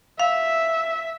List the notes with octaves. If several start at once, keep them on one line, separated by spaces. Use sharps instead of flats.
E5 F5